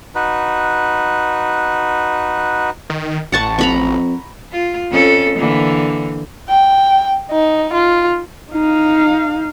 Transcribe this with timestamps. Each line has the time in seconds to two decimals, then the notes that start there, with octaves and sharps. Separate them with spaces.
0.15 D#4 F#4 B4
2.90 D#3
3.32 A1 F#5 A5 C#6
3.58 F2 A#5 B5 C#6
4.52 F4
4.92 F2 C#4 A4
5.39 D3 E3 A#3
6.49 G5
7.31 D#4
7.73 F4
8.52 D#4 F5